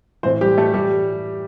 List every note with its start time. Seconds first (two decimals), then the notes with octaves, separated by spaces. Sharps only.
0.23 A2 E3 C4 C5
0.41 G3 G4
0.58 A3 A4
0.73 A2 E3 G3 G4